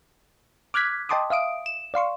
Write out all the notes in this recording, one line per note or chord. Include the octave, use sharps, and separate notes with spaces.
D6 F6 F#6 G#6 B6
D#5 G5 A5 C6 D6 D#6
E5 F5 D#6 D7
E7
D5 F5 C6 C#6